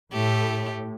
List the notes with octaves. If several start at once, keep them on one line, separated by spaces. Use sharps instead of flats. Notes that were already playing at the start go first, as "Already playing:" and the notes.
A2 A3 G4